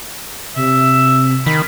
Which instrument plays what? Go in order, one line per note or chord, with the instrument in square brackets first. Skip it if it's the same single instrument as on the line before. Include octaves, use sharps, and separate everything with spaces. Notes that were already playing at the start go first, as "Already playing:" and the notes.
[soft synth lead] C3 [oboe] E5
[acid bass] D#3 [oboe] B5